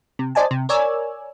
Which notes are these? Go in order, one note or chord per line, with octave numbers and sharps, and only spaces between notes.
C3
C5 D5 D#5 G#5 A5
C3
A#4 C#5 D5 G#5 E6